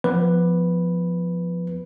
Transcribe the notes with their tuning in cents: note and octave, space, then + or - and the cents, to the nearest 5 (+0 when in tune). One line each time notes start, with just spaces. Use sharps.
F3 +0 B3 +0 B4 +0